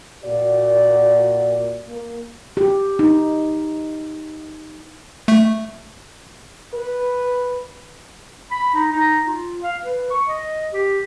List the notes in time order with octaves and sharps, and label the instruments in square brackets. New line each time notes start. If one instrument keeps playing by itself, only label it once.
[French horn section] A#2 F#4 D5
A#3
[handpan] G4
D#4
[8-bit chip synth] A3
[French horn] B4
[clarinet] B5
D#4
D#4
F4
F5
B4
C#6
D#5
G4